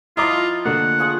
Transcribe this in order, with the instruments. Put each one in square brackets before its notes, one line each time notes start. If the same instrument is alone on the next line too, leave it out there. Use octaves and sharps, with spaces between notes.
[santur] F3 D#5 [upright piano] E4 A#5 D6 [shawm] F4
[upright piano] D3 A3 A#3 [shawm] F#5
[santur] F3 G#4 C#6